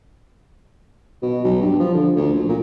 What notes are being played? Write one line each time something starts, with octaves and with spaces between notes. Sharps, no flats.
B2
B1
G2
F3
D3
D2
A#1
A#2